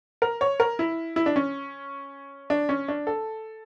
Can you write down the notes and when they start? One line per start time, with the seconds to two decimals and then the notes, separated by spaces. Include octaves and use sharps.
0.22 A#4
0.41 C#5
0.60 A#4
0.79 E4
1.16 E4
1.26 D4
1.36 C#4
2.50 D4
2.69 C#4
2.88 D4
3.07 A4